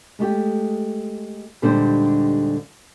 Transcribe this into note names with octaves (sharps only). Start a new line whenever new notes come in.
G#3 A3 G4
D#2 A#2 D3 G3 G#3 C5